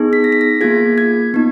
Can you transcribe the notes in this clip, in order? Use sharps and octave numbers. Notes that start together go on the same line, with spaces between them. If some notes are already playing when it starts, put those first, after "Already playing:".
Already playing: B3 D#4 G#4
B6
A#6
B6
A#6
A#3 F4 G#4 G#6
G#6
B3 D#4